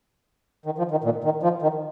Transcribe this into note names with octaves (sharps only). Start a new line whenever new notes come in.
D#3
F3
D#3
A#2
D#3
F3
D#3